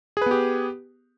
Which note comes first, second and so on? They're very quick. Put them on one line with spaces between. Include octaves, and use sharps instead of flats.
G#4 B4 B3 G4